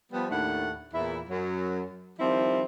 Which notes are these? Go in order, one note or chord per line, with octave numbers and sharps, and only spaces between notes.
F3 G3 B3
D#2 A2 A3 D4 F#5
E2 A#2 E4
F#2 F#3
D#3 F3 G3 C4 E4